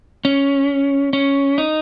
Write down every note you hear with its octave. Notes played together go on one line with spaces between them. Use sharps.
C#4
C#4
D#4